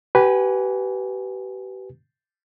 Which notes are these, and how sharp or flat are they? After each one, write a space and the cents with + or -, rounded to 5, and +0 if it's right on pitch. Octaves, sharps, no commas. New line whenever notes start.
G4 -35 B4 +0 G#5 +0